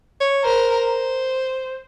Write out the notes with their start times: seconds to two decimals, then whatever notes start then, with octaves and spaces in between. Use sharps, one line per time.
0.21 C#5
0.44 A#4 C5